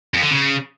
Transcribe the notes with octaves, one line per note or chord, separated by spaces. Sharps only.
F2
D3
C#3